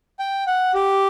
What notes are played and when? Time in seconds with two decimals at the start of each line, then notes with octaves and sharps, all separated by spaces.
0.19 G5
0.47 F#5
0.74 G4